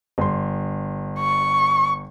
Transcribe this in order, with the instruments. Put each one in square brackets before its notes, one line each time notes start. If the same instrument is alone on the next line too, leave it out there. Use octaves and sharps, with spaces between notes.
[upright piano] G1 C6
[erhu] C#6